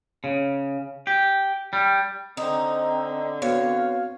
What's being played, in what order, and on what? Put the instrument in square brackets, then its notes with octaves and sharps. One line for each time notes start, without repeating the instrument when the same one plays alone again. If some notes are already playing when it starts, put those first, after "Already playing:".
[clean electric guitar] C#3
G4
G3
[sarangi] D3 [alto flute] C4 [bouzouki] D#4
[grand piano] B3 C4 F#4 [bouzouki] C#5 [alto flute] F5